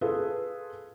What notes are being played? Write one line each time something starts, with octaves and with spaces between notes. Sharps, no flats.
F4 G#4 A4 B4